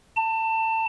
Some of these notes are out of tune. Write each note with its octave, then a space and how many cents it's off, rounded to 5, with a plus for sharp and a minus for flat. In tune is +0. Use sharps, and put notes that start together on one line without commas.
A5 +25